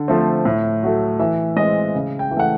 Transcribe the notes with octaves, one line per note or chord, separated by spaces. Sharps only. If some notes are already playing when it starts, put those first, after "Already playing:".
Already playing: D3
F3 A3 C4
A2
F#3 A3
E3 E5
G#3 C4 D#5
C#3
G5
E3
A3 F#5